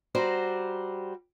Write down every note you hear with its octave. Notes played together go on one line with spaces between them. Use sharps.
G3 F#4 C5 A#5